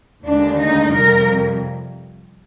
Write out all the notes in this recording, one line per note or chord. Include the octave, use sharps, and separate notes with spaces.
D#2 D3 G#3 D4
D#4
F2 C3 G3 A#4